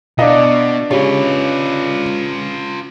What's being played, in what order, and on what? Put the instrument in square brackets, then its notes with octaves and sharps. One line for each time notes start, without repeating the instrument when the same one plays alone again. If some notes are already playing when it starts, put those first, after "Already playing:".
[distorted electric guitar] B2 [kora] B3 [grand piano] D4 D#5 [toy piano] E4 F5
[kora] C#3 [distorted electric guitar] F4 B4 [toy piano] G4 G#4